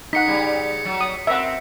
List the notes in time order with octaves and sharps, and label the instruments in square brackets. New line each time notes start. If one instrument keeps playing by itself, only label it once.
[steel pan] D#4 F#5 [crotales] B6 C#7
[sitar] C#3 G3
F#3
[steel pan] D#6
[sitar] C4 A#4 [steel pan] E5 F#5